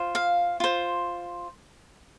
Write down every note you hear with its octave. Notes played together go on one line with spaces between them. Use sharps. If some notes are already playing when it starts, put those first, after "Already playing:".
Already playing: F4 C5
F5
F4 C5